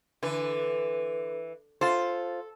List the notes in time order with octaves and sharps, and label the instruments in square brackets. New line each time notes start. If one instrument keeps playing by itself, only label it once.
[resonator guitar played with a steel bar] D3 [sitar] E3 B4
[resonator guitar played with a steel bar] F4 C5 [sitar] A4